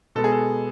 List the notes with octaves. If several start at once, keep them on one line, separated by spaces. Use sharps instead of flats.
B2 G#3 B3 A4
G#4
A4